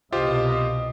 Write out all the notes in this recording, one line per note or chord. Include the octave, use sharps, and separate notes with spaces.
C2 B2 F4 G4 C5 D#5